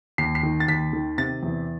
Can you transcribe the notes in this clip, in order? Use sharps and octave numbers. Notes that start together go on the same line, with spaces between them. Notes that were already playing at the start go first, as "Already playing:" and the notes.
D#2 C7
C7
D#3
A6
D#2 B6
D#3
C3 A6
E2